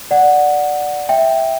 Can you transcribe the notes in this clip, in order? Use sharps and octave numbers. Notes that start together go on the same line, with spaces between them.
D5 F#5
E5 G5